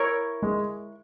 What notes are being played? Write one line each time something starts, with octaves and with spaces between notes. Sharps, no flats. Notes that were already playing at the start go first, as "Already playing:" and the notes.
Already playing: E4 A#4 C#5
G#3